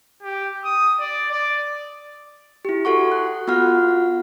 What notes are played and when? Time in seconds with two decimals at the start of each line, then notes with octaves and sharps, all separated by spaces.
0.23 G4
0.65 D#6
1.00 D5
1.32 D5
2.65 E4 G4
2.85 F#4 A4 F#5 C#6
3.12 F#6
3.47 B3 F4 F#4 F#5 F6